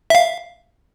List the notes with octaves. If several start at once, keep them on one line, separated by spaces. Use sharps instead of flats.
E5 F5